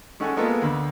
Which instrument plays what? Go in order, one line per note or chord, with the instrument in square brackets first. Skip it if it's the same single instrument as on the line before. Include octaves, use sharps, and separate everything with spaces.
[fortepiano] G#3 C#4 A4 F#5 G#5
G#3 A#3 B3 F4 A4
D2 B5